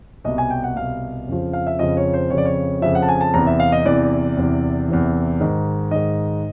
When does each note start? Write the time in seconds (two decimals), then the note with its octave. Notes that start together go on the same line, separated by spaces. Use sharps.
0.24 C2 B2 D#5
0.38 G#5
0.50 G5
0.64 F#5
0.76 C2 B2 F5
1.28 F2 C#3 F3
1.53 F5
1.67 E5
1.79 F2 C#3 F3 D#5
1.97 C#5
2.13 C5
2.30 F2 C#3 F3 C#5
2.38 D5
2.45 C#5
2.82 F2 C#3 F3 E5
2.95 F#5
3.02 A5
3.09 G#5
3.21 A5
3.34 E2 C3 E3 A#5
3.47 E5
3.60 F5
3.72 D#5
3.85 E2 C3 E3 D5
4.37 E2 C3 E3
4.88 E2 C3 E3
5.40 G#2 D#3
5.91 G#2 D#3 D#5